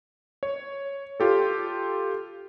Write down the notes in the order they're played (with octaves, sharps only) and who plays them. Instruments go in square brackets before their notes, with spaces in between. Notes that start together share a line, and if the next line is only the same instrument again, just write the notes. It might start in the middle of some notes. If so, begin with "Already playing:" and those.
[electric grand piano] C#5
F4 G4 A4